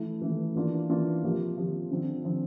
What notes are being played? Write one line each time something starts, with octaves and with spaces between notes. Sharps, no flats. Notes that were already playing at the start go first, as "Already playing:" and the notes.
Already playing: E3 A3 E4
E3 A3 E4
E3 A#3 D4 F4
E3 A#3 D4 F4
C3 F3 A#3 F4
C3 F3 A#3 F4
D3 F3 C4 F4
D3 F3 C4 F4